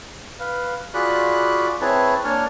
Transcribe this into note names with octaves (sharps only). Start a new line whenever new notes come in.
B4 F5
F4 F#4 G#4 D5 B5 F#6
C4 E4 G#4 B4 C#5 A5
A#3 D4 C#5 G#5 A5 F6